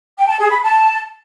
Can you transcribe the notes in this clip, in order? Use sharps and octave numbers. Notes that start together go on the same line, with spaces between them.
G5
A5
G#4
B5
A5